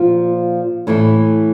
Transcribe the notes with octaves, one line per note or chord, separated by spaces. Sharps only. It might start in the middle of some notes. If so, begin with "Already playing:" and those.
Already playing: A#2 F3 F4
A2 E3 A3 E4